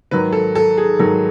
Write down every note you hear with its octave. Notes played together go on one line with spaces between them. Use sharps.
G#2 D#3 F#3 B4
A4
A4
G#4
G#2 D#3 F#3 A4